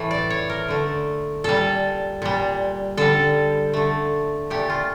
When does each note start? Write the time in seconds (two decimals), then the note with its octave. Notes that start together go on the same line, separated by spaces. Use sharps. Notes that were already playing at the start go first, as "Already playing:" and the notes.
Already playing: A2 E3 A3
0.11 D5
0.30 C#5
0.50 A#4
0.68 D3 A3
1.44 A#2 G3 A4
2.22 A#2 G3
2.97 D3 G3 A4
3.73 D3 A3
4.50 A#2 A3 G4
4.70 F4